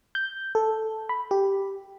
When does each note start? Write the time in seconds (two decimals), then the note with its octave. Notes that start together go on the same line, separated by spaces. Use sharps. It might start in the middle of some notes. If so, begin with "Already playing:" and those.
0.15 G6
0.55 A4
1.09 B5
1.31 G4